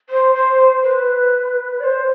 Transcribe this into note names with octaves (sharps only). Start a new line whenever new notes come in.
C5
C5
B4
D5
C5